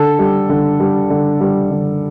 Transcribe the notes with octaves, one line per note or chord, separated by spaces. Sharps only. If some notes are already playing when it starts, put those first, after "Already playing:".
Already playing: D3 A4
G3
D3
G3
D3
G3
D3